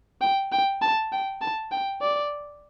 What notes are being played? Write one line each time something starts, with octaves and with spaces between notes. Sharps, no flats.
G5
G5
A5
G5
A5
G5
D5